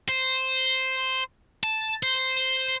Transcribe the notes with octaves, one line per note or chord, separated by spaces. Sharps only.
C5
A5
C5